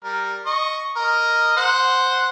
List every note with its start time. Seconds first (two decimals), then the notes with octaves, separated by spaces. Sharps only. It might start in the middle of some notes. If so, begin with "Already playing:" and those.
0.04 G3 A#4
0.46 D#5 C#6
0.96 A#4 D#5
1.57 C5 F#5